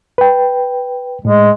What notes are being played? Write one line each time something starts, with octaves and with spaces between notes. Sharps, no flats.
B4 G5
A2 G#3